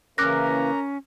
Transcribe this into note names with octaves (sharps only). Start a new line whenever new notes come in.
C#3 E3 A#3 C#4 A#4 D6 F#6 A#6